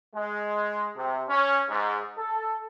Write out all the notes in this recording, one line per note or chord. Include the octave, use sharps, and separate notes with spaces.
G#3
C3
C#4
G#2
A4